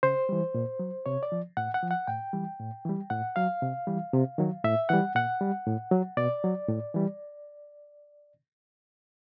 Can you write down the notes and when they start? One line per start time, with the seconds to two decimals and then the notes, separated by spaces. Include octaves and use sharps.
0.03 C#3 C5
0.29 E3 G3
0.54 A#2
0.79 F#3
1.06 C3 C#5
1.23 D5
1.32 F3
1.57 A2 F#5
1.74 F#5
1.83 F3
1.91 F#5
2.07 A2 G5
2.33 E3 G3
2.60 A2
2.85 E3 G3
3.10 A2 F#5
3.36 F#3 F5
3.62 C3
3.87 E3 G3
4.13 C3
4.38 D#3 F#3
4.64 A2 E5
4.89 E3 G3 F#5
5.15 A#2 F#5
5.41 G3
5.66 A2
5.91 F#3
6.17 B2 D5
6.44 F#3
6.68 A2
6.94 E3 G3